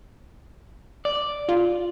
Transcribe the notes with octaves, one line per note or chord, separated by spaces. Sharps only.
D5
F4